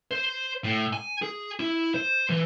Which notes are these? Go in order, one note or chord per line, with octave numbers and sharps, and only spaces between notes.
C5
A2
G#5
G#4
E4
C5
E3